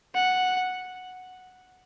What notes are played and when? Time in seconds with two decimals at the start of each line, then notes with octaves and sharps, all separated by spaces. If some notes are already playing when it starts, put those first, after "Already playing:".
0.15 F#5